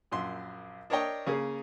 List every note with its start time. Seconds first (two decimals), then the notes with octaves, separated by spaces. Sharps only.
0.12 A#1 F#2 C6
0.90 D4 A#4 C#5 D#5 G5
1.26 C#3 A#3 G#4